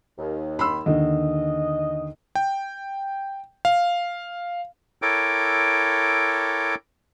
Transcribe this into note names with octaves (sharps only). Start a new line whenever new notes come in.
D#2
B5 C6 E6
D#2 D3 D#5
G5
F5
E4 A4 A#4 C#5 G5 D6